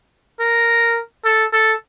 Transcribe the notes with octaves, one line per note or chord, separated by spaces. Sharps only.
A#4
A4
A4